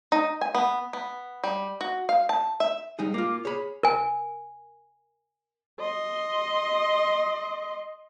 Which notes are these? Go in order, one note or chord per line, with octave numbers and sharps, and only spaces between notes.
D#4
G#5
B3
B3
G3
F#4
F5
A5
E5
G3 D#4 G#4
A#3 F4 D6
G#4 C#5 B5
A#4 G#5
D#5 C6